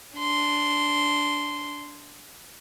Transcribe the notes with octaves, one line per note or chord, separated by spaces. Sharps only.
D4 C6